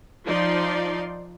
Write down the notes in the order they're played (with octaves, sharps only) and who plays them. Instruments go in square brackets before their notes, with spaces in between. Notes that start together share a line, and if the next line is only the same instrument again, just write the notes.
[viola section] F3 D#4 D5 C6